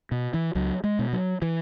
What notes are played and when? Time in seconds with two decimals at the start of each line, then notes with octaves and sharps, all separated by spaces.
0.12 B2
0.34 E3
0.55 C#2 F#3
0.84 G#3
0.99 B2
1.13 F#3
1.42 E3